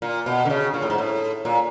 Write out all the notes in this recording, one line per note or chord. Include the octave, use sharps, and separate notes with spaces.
A#2
B2
D3
C#3
A#2
A2
G#2
A2
A#2